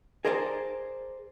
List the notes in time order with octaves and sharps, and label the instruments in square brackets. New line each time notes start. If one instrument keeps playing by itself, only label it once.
[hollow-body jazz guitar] G#4 A#4 C5 D5 G5 A5